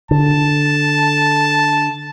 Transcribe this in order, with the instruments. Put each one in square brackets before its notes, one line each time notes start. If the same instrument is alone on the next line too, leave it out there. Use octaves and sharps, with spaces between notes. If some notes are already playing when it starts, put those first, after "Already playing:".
[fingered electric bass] D3 [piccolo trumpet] A5